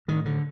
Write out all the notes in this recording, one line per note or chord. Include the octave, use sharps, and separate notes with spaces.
A2 D#3
D3